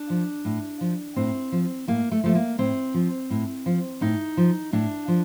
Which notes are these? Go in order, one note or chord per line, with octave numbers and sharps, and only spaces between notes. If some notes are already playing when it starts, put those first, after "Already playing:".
Already playing: D4
F3
A2
F3
A2 C4
F3
A2 A#3
A3
F3 A3
A#3
A2 C4
F3
A2
F3
A2 D#4
F3
A2 D4
F3